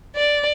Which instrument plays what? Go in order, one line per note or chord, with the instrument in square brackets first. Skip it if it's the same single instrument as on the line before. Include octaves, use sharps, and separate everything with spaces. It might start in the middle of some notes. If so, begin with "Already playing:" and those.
[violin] D5